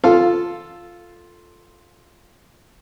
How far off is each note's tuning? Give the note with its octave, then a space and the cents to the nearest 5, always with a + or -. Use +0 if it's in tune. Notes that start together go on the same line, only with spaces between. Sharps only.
F4 +0 A4 +0 F5 +0